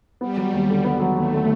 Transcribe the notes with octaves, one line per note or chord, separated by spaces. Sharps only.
G3 B3
F#3
D#2
D3
B3
F#3
D#2 A3
D3